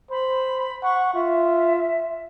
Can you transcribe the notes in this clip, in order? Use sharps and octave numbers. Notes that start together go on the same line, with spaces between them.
C5 B5
F#5 C#6
F4 E5